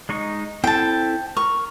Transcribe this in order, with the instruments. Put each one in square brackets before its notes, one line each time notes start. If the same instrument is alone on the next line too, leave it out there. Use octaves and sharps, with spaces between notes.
[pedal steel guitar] G#3 D#4 C#6
[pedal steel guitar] C4 E4 A4 [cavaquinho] G5 A5
[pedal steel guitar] A#4 [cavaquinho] C#6